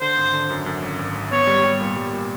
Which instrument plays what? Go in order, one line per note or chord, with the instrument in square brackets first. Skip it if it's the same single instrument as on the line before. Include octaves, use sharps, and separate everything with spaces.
[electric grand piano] D3 [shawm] C5
[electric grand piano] G#1
D3
F#2
F#2
G#1
G#1
G#1
[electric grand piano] B3 [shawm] C#5
[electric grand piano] G3
G3
A#2
G3
A#2